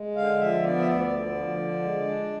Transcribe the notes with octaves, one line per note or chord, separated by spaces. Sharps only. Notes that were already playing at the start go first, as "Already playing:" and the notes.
Already playing: G#3
D3 F5
F3 E5
B3 D5
E5
D2 D5
D3
F3
D3
G#3
D4